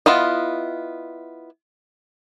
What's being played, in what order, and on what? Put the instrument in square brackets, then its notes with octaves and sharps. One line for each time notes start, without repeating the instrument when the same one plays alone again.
[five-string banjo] B3 E4 F4 D#5